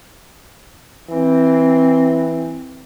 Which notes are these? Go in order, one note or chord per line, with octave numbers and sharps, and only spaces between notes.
E3 C4